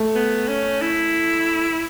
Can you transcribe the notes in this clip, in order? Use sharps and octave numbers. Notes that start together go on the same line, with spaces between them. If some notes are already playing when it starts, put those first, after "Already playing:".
Already playing: A3
B3
C#4
E4